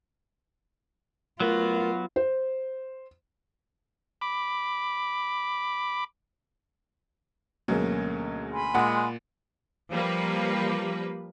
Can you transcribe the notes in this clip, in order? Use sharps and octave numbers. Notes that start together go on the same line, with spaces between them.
F#3 A3 B3 F4 F#4 A#4
C5
B5 D6
D2 B2 F#3 G#3 A#3 C#4
G#5 B5 C6
A#2 G#3 F#5
F3 G3 A#3 B4